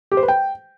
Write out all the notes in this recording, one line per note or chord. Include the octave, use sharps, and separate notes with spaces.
G4
C5
B4
G5